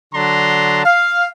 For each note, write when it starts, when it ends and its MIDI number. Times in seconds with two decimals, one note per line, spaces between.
0.14 0.82 50
0.14 0.82 54
0.14 0.82 62
0.14 0.82 81
0.14 0.82 82
0.14 0.82 84
0.84 1.27 77